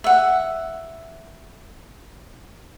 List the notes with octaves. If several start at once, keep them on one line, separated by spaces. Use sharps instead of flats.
E5 F#5